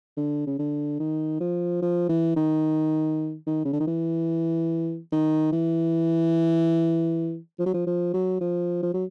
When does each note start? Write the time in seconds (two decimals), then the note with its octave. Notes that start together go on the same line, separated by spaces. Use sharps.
0.17 D3
0.47 C#3
0.59 D3
1.00 D#3
1.40 F3
1.82 F3
2.09 E3
2.36 D#3
3.47 D#3
3.65 C#3
3.73 D3
3.80 D#3
3.87 E3
5.12 D#3
5.52 E3
7.59 F3
7.66 F#3
7.74 F3
7.87 F3
8.14 F#3
8.41 F3
8.83 F3
8.94 F#3